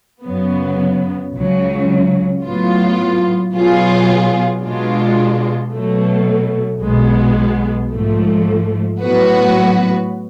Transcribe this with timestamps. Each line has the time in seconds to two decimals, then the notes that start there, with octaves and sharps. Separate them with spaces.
0.24 F#2 C#3 F#3 B3
1.33 C#2 C#3 F#3
2.43 A2 F#3 B3 F4
3.53 B2 F#3 B3 F4 G#4
4.62 B2 G#3 D4 F4
5.72 B2 F#3 A3
6.80 B1 B2 G#3 B3
7.90 G#2 F3 A3
9.00 A2 F#3 B3 F#4 B4